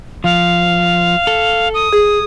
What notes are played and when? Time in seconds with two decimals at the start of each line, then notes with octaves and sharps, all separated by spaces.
0.24 F3 F5
1.27 A4
1.74 D#6
1.93 G#4